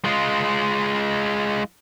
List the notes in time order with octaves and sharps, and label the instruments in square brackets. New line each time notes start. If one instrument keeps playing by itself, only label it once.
[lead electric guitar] G#3 F4